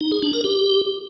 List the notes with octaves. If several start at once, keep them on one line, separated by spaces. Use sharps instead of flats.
D#4
G#4
D4
A#4
G4